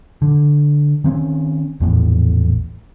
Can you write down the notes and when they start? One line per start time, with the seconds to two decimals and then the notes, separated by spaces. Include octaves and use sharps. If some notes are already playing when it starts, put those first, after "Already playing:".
0.22 D3
1.04 D#3 C4 C#4
1.80 A#1 E2 A2